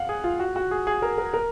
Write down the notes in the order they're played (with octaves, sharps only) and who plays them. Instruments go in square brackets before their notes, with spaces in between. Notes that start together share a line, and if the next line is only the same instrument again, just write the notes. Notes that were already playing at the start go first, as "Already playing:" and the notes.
Already playing: [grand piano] F5 F#5
G#4
F4
F#4
F#4
G#4
G#4
A#4
A#4
A#4